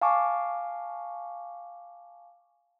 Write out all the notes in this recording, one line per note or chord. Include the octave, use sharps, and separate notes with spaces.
F5 G#5 A5 C#6 D6